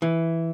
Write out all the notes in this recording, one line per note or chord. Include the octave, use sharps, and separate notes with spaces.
E3